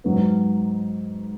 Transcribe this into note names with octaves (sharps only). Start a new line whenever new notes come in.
G#2 F#3 B3